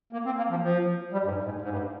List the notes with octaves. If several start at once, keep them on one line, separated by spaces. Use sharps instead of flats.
A#3
C4
A#3
F3
F3
G3
G2
G#2
G#2
G#2
G2